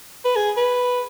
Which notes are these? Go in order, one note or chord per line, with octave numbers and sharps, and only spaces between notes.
B4
G#4
B4